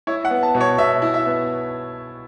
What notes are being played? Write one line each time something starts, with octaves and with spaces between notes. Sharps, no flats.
E4 C#5
F#5
B3
A5
B2
C#5
B2 E5
E4
E5
B3